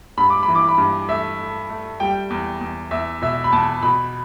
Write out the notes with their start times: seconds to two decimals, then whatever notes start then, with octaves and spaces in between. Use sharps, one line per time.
0.17 G2 B5
0.30 D6
0.43 B5
0.48 E3
0.55 D6
0.68 B5
0.78 G2
1.09 A3 E5
1.39 A3
1.70 A3
2.00 G3 G5
2.30 E2
2.61 E2
2.91 E2 E5
3.22 B2 E5
3.44 B5
3.53 E2 A5
3.83 B2 B5